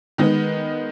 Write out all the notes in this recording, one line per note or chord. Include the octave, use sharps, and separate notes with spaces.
D#3 G#3 B3